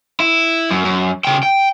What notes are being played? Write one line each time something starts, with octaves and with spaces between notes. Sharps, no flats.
E4
F#2
F#2
C#3 G5
G5